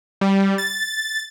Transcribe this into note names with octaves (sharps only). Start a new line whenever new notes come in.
G3
A6